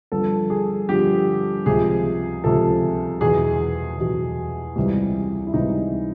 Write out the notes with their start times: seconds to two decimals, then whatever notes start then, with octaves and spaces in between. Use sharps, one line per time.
0.12 G2 D3 F3 A4
0.50 G#4
0.89 G2 D3 F3 G4
1.66 C#2 C3 F3 G#4
2.44 C#2 C3 F3 A4
3.21 E2 B2 F#3 G#4
3.98 E2 B2 F#3
4.76 C#2 C3 E3 G3
5.47 E4
5.53 C#2 C3 E3 G3 D#4